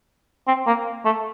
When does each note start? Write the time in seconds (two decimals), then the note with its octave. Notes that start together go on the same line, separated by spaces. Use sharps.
0.47 C4
0.67 A#3
1.05 A3